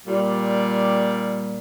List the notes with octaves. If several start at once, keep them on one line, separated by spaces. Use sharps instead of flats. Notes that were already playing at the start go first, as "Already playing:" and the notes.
A#2 G3